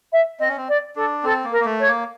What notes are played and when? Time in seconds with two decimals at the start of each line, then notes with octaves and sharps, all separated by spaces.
0.12 E5
0.39 C4 D#5
0.48 C#4
0.57 C4
0.68 D5
0.96 D4 A4
1.23 C4 A4
1.44 A#3
1.51 A#4
1.60 A#3
1.65 A3
1.79 C#5
1.87 A#3